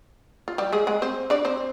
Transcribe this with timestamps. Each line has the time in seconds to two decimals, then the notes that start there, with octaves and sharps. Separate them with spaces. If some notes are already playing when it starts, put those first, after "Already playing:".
0.48 F4
0.58 G3 G4
0.73 G#3 G#4
0.87 G#3 G#4
1.02 C4 C5
1.30 D4 D5
1.45 C4 C5